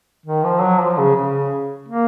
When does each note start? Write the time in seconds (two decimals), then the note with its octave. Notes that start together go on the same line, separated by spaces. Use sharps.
0.26 D#3
0.45 F3
0.62 F#3
0.81 F3
0.98 C#3
1.16 C#3
1.88 A#3